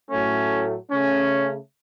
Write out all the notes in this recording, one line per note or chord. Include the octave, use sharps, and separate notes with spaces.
A2 F#3 A3 C#4
C#3 A3 C#4